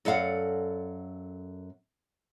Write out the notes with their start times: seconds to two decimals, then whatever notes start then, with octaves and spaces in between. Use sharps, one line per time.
0.05 F#2 A4 D5 F5 F#5